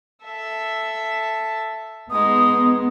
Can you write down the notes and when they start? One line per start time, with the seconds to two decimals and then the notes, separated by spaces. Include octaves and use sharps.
0.24 A4 E5
2.10 G#3 B3 D#4 D#6